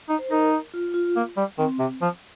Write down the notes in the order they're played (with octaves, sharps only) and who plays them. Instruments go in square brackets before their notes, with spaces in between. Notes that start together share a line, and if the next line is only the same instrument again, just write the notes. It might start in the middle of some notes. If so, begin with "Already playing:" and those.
[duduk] D#4
[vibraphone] C5
[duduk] D#4 [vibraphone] A#4
[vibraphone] F4
F4
[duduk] A#3
G3
[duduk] D#3 [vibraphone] C4
[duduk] C3
F3